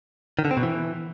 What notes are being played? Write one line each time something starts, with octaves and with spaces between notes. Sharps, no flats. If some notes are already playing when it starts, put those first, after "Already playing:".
D#3
D3
C4
B2
E3